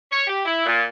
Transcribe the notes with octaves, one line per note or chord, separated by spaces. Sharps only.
C#5
G4
E4
A#2